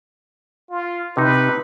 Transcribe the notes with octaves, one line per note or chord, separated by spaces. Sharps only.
F4
C3 D#4 B4